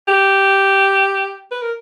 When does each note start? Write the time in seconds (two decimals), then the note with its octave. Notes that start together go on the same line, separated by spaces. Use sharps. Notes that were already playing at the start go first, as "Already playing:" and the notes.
0.08 G4
1.52 B4
1.62 A#4